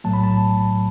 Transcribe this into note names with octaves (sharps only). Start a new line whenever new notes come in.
B1 A2 F#3 A3 A5
B5
A5